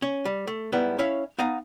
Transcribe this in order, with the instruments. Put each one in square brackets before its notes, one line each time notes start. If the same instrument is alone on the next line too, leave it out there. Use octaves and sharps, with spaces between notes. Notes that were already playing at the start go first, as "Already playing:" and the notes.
[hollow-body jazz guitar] C#4 C#5
G3
A3
G#2 G3 B3 E4
C#4 E4 C#5 E5 F5
B3 D#4 F5 G#5 A#5